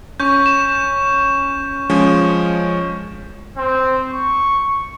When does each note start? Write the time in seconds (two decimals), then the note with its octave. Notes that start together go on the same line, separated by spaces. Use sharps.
0.20 C#4 C#6 G6
0.46 E7
1.90 F3 G#3 C#4
3.57 C4
4.12 C#6